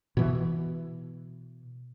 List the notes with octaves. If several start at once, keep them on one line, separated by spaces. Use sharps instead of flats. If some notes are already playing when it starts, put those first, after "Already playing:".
B2 E3